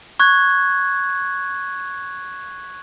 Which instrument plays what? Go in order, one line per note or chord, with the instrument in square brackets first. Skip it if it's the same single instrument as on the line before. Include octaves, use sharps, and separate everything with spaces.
[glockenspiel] C#6 F#6 G#6